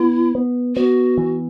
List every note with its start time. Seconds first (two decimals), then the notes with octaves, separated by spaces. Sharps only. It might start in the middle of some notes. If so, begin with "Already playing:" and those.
Already playing: B3 E4
0.35 B3
0.75 B3 F#4
1.18 E3